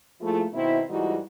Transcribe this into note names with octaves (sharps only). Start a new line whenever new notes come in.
F3 A3 A#3 E4 F4 G#4
B2 D#3 C4 E4
G#2 E3 G3 D#4 F4 F#4